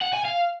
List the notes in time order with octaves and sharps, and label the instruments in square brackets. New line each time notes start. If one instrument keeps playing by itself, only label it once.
[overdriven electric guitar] F#5
G#5
F5